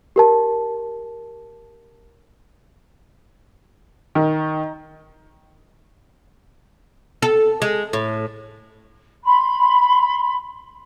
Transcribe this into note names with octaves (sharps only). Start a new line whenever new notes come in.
G4 A#4 A5
D#3
A4
G#3
A2
B5 C6